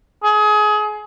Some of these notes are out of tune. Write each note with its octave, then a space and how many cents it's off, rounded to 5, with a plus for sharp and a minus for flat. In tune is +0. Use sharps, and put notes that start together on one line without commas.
G#4 +25